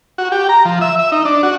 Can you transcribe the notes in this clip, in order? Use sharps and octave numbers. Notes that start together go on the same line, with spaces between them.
F#4
G4
A#5
F3
E5
E5
D#4
D4
F#4